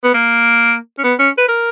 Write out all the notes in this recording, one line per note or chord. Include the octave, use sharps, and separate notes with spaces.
B3
A#3
C#4
B3
C#4
B4
A#4